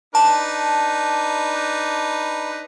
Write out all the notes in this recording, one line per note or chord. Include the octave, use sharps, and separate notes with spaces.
D4 D#4 B4 A5